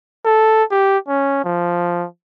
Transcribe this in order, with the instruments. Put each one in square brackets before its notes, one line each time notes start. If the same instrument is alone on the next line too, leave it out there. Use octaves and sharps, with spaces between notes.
[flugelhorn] A4
G4
C#4
F3